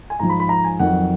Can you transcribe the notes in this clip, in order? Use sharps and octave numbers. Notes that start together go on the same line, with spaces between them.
G#5
G#2 F3 A#5
B5
B5
A#5
G#5
F2 D#3 F#3 F#5